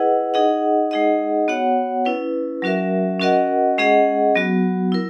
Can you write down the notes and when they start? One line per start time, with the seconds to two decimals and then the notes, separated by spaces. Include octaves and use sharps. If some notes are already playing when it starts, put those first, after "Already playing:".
Already playing: E4 G#4 B4 D#5 F#5
0.34 D#4 G#4 D#5 F#5
0.91 G#3 D#4 G#4 D#5 F#5
1.48 B3 F#4 C#5 F#5
2.05 C#4 E4 B4
2.62 F#3 C#4 F#4 A#4 E5
3.20 C#4 F#4 A#4 D#5 F#5
3.78 G#3 C#4 G#4 D#5 F#5
4.35 F#3 B3 F#4
4.92 E4 A#4